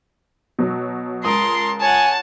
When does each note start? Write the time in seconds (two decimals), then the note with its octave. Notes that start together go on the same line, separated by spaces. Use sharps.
0.59 B2 F#3
1.24 C#2 A#4 A5 C6 D#6
1.81 C#5 F#5 G#5 A5